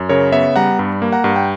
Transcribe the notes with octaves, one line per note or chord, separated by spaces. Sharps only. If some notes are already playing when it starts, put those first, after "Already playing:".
Already playing: F#2
C#3 A#4 C#5
B3 C#5 E5
G3 F#5 A#5
G2
A#3
F#5 A#5
G2
G5